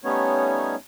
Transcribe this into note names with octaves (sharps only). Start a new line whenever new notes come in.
G3 A3 B3 C#4 D#4 C#5